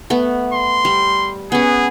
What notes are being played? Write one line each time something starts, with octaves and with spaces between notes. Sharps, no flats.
A3 B3
C6
G3
B3 C#4 G#4